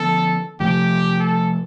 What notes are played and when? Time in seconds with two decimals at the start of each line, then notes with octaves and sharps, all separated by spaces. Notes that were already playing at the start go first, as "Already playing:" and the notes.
Already playing: D3 F3 B3 A4
0.60 C3 F3 A3 G4
1.20 A4